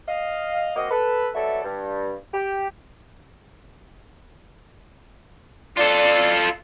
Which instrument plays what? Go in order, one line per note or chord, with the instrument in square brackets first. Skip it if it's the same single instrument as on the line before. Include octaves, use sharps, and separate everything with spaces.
[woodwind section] D#5 F5
A#3 C4 F#4 D#5
A4 B4
F#3 A3 B3 A4 D5 E5
G2
G4
[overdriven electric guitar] F4 A4 [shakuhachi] D5